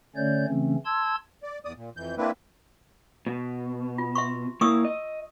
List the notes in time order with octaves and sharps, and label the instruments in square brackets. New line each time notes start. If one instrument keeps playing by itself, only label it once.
[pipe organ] D3 A3 C#4 C#5 D5 G6
C#3 E3 A3 C4 C#4
A5 C6 E6 G#6
[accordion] D5
E2 D5 D#6
A#2
F2 E3 G6
A#3 C4 D4 E4 B4
[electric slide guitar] B2
[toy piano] F4
E5 C6 C#6
[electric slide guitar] A#3 E4 [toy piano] C#6 D#6 E6
[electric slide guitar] D#5